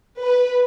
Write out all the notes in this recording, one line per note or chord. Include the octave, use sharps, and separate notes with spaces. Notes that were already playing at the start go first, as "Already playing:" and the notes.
B4